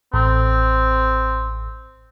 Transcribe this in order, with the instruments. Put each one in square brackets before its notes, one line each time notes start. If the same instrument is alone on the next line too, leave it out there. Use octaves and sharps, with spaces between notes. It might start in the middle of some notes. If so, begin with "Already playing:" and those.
[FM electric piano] A1 [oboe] C4